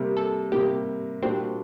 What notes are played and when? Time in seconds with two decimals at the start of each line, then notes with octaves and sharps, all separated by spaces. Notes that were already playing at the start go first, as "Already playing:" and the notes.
Already playing: C3 G3 A#3 A#4
0.17 A4
0.52 C3 G3 A#3 G4
1.22 A#2 G3 A#3 C4 D4 F#4